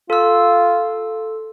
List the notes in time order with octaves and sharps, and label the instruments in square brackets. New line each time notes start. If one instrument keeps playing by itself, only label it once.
[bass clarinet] F4 [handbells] A4 E6